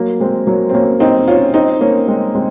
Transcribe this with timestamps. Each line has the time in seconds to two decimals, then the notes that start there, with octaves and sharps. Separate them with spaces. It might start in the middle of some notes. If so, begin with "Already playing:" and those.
Already playing: F#3 A#3
0.20 G#3 C4
0.47 F#3 A#3
0.69 C4
0.74 A#3 C#4
1.00 C4 D#4
1.28 C#4 F4
1.54 C4 D#4
1.81 A#3 C#4
2.07 G#3 C4
2.35 G#3 C4